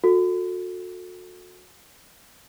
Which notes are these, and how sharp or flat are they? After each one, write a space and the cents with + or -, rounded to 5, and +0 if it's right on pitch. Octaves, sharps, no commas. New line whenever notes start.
F#4 -35 A4 +15